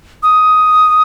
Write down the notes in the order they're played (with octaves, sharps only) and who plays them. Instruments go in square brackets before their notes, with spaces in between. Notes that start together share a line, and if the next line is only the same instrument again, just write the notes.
[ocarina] D#6